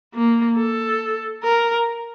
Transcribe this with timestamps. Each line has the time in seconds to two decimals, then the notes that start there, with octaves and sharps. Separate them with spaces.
0.14 A#3
0.56 A4
1.43 A#4